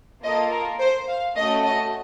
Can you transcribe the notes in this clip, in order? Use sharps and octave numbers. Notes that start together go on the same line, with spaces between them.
A#3 F4 A4 D#5
A#4
C5
F5
A3 C#4 F#4 A4 D#5
D#5